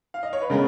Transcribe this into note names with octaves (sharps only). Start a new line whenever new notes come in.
F5
D#5
C#5
B4
C#3 G#3 B3 A#4